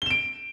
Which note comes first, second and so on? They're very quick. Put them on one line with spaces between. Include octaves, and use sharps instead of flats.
G7 E7 D7